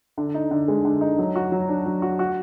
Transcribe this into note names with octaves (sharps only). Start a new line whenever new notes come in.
D3
D#4
D3
G#3
D3
D#4
F#3
F#4
F#3
D4
F#3
F#4
F#4